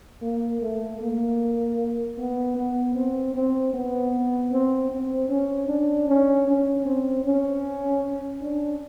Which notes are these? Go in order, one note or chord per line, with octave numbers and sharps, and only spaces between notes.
A#3
A3
A#3
B3
B3
C4
C4
B3
C4
C4
C#4
D4
C#4
C#4
C4
C#4
D4